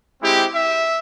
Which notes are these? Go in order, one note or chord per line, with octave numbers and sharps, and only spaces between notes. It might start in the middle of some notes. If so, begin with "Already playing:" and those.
G#3 C4 E4 G4
E5